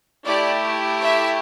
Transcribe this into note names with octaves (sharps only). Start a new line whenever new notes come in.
A3 E4 G4 D5
E5